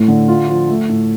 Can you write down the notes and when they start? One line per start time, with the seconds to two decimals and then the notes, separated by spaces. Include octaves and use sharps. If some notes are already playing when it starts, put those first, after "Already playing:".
Already playing: A2 A3
0.08 D3
0.28 F4
0.48 F3
0.69 A3
0.89 A2